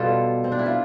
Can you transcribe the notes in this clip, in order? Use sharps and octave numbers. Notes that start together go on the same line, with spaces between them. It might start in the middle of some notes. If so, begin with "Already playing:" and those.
Already playing: B2 G3 F4 A4
C4
D4
E4
F4